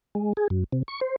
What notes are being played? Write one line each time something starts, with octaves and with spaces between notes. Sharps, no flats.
G#3
G#4
F#2
C3
C#6
C5